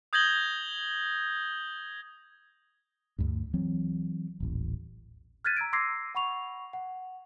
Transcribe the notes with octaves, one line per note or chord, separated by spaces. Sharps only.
D#6 G6 G#6 A#6 F#7 G7
D2 G2
E3 F#3 C4
D#1 A1
F6 F#6 G#6 A6 B6 D#7
A#5 E6 G#6 D7
C6 D6 E6 G#6 A#6 C7
F#5 B5 C#6 F7
F#5